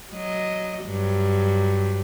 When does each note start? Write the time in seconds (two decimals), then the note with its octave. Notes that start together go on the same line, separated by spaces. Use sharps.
0.13 F#3 D#5
0.84 G2 F#3